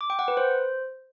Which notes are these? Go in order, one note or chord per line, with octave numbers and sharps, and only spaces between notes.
D6
G5
F#5
B4
C5